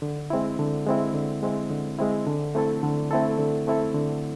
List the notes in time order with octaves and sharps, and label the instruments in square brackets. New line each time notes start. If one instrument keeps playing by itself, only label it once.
[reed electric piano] D3
G#3 C4 E4
D3
G#3 C4 E4
D3
G#3 C4 E4
D3
G#3 C4 E4
D3
A3 C4 E4 A4
D3
A3 C4 E4 A4
D3
A3 C4 E4 A4
D3